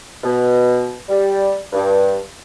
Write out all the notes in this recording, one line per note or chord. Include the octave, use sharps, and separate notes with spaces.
B2
G3
G2